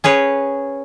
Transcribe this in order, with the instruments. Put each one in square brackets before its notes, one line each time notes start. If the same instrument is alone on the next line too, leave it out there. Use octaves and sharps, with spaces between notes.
[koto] C#4 G#4 B4 C#5